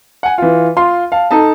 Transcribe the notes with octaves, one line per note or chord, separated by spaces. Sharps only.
F#5 G#5
E3 F4
F4 C6
F5 A5
D#4 A4 A5